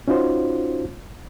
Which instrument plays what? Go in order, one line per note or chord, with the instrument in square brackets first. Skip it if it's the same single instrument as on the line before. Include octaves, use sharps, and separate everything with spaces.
[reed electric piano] C#4 D#4 F4 F#4 C5